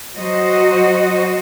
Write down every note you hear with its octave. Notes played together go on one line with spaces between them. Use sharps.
F#3 F#4 C5 D#5